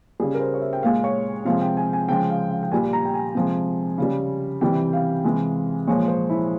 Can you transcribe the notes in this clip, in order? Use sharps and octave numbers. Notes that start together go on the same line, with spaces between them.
C#3 G3 G#4
A#4
C5
C#5
E5
G5
A#2 G#3 F5
C#5
C3 F3 G#3 F5
G5
G#5
G#5
C#3 F3 G#3 G5
F5
F5
G5
A#2 G3 G#5
A#5
G5
G#5
C3 F3 G#3
C#3 G3
C3 E3 G3 G5
F5
C3 E3 G#3
A#2 F3 G#3 C#5
C5
E4